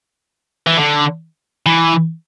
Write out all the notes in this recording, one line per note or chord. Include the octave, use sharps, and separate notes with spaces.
E3
D3
E3